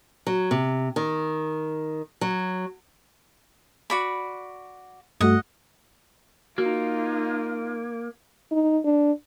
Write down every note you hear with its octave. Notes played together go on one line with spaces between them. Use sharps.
F#3
C3
D#3
F#3
F#4 D5 B5
G2 A3 F#4 D#5 F#5
A#3 D#4 F4 F#4
D#4
D4